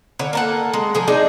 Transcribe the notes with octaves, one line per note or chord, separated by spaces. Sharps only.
D3 C#5
A#3 A4 F#5
G#3
F3 G#4
G#3 D4 D#4 G#4